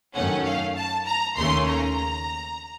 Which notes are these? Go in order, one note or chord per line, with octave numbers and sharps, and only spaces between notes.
F#2 D#3 A3 C#4 F#5
F5
A5
A#5
D#2 C#3 A3 C#4 C6
A#5